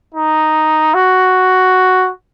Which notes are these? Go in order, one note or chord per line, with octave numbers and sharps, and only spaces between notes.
D#4
F#4